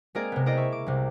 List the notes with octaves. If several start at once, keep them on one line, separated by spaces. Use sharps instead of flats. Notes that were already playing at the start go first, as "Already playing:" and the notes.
G#3 A#3 C4 G#4 A#4 D5
C3 B3
E4 A#4 C5 D5 D#5
E5 C#6
D6
C2 C3